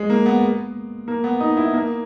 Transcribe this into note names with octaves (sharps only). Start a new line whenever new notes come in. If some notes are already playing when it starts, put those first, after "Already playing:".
Already playing: G#3
A#3
B3
A#3
B3
D#4
E4
A#3